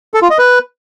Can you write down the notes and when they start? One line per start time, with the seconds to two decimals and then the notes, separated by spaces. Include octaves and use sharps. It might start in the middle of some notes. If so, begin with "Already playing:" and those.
0.14 A4
0.22 F4
0.30 D#5
0.38 B4